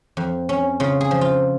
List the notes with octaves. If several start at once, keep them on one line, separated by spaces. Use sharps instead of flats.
F2
C#4
C#3 F4
G#4
F3
F4